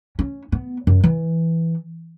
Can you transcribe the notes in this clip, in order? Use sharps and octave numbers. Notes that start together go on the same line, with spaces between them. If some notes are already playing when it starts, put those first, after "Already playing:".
C#4
B3
F#2
E3